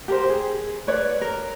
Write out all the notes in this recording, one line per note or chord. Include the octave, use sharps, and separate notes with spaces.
G4 A#4 C5
G#4
B4 C#5 D5
A#4